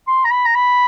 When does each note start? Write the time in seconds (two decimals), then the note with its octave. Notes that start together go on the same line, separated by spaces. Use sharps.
0.07 C6
0.25 A#5
0.31 B5
0.46 A#5
0.55 B5